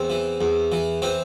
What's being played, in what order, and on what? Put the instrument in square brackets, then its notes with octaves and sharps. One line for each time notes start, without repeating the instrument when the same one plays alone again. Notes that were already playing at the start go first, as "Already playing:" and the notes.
Already playing: [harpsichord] E2 C4
E3
E2
E3
E3 C4